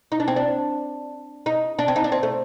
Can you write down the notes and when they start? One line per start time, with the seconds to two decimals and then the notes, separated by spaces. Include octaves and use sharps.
0.12 D#4
0.20 D4
0.28 C4
0.36 D4
1.46 D#4
1.79 D4
1.88 C4
1.96 D#4
2.04 D4
2.12 C4
2.23 A3